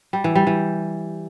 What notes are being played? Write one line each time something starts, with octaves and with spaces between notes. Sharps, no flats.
G3
E3
G3
E3